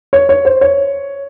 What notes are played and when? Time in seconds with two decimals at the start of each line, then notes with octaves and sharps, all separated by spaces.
0.13 C#5
0.29 C#5
0.45 C5
0.61 C#5